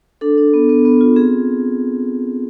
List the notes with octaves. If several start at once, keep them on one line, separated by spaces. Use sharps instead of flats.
D4 A4
D4
B3
B3
B3
F4
C4 G#4